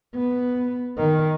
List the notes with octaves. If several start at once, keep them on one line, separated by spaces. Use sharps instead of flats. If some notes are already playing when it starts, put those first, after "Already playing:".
B3
D#3